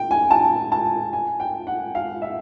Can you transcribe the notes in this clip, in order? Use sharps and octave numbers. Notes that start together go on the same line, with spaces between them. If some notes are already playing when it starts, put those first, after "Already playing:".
Already playing: G5
G#5
A5
A5
G#5
G5
F#5
F5
E5